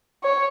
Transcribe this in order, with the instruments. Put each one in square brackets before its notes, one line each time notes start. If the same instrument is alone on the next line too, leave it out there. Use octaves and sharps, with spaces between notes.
[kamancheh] C#5